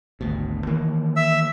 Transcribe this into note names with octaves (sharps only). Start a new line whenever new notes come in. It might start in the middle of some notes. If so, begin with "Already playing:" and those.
G#1 D2 B2
D#3 E3 A#3
E5 E6